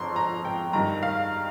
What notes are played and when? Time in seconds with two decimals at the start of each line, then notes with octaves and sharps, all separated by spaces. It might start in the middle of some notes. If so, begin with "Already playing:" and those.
Already playing: G1 F2 F3 A#5 C6
0.16 A#5
0.45 G5
0.73 G2 D#3 G3 A#5
1.03 F5